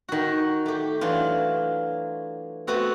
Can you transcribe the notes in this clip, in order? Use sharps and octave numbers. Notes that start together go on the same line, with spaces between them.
D#3 F#4
A3 G4
E3 F#3 D4 F4
A3 B3 C4 F#4 A4